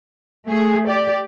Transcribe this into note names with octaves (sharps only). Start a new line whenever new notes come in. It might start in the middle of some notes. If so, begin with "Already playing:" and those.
A3 G#4
G4 D5